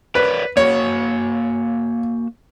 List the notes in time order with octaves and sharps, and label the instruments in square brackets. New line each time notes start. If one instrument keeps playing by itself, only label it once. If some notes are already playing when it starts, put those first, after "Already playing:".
[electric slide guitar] A#4 C#5 D5 [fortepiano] B4
[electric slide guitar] A#3 F#4 [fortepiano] C#5